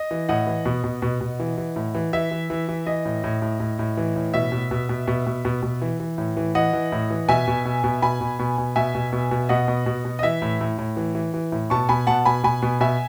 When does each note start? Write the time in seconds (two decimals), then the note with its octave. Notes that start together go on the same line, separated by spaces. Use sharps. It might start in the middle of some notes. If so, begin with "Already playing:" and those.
Already playing: D#5
0.11 E3
0.29 A2 D#5 F#5
0.47 E3
0.66 B2
0.84 B2
1.02 B2
1.21 B2
1.40 E3
1.58 E3
1.76 A2
1.95 E3
2.13 E3 E5
2.31 E3
2.50 E3
2.69 E3
2.87 E3 D#5
3.05 A2
3.24 A2
3.42 A2
3.60 A2
3.79 A2
3.97 E3
4.16 A2
4.34 B2 E5
4.52 B2
4.71 B2
4.89 B2
5.08 B2
5.27 B2
5.45 B2
5.63 B2
5.82 E3
6.00 E3
6.18 A2
6.37 E3
6.55 E3 D#5 F#5
6.73 E3
6.92 A2
7.10 E3
7.28 B2 E5 G#5
7.48 B2
7.65 B2
7.84 B2
8.02 B2 G#5 B5
8.21 B2
8.39 B2
8.58 B2
8.76 B2 E5 G#5
8.95 B2
9.13 B2
9.31 B2
9.49 B2 D#5 F#5
9.68 B2
9.86 B2
10.05 B2
10.19 D#5
10.23 E3 E5
10.42 A2
10.61 A2
10.78 A2
10.97 E3
11.15 E3
11.34 E3
11.52 A2
11.70 B2 A5 C#6
11.89 B2 G#5 B5
12.07 B2 F#5 A5
12.25 B2 G#5 B5
12.44 B2 G#5 B5
12.62 B2
12.80 B2 E5 G#5